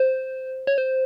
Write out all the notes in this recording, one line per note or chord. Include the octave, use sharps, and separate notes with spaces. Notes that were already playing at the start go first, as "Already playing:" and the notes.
Already playing: C5
C#5
C5